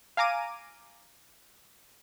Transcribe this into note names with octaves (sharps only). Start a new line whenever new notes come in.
F5 G#5 A#5 D6 D#7